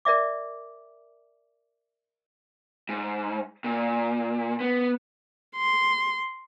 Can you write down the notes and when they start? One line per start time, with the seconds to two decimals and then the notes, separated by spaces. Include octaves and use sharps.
0.05 A#4 D5 E5 D6
2.89 G#2
3.64 A#2
4.60 B3
5.56 C6